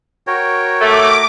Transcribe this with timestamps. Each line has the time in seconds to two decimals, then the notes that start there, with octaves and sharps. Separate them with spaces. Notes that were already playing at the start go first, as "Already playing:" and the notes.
0.27 F#4 A#4 C#5 G5
0.81 A3 D6